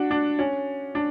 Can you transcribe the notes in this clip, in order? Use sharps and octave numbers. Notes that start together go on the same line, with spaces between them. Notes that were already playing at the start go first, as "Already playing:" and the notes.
Already playing: D4 F#4
D4
C#4
D4